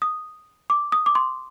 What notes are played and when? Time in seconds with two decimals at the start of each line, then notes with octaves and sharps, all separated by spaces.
0.02 D#6
0.70 D6
0.92 D#6
1.06 D6
1.15 C6